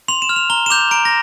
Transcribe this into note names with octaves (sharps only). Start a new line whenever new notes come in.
C6 F7
E7
F6
F7
A#5 G7
E7
D6 G6 F7
A#5 D7
A#6